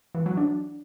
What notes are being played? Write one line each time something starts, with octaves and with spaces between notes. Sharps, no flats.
E3
F#3
D4